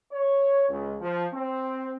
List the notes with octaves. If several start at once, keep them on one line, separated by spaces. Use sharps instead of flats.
C#5
C#2
F3
C4